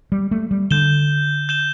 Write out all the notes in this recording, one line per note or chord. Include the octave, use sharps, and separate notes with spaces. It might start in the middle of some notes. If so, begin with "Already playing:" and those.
G3
A3
G3
D3 G6 E7 G7
G6 E7 G7